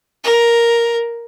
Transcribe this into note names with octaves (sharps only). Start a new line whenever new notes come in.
A#4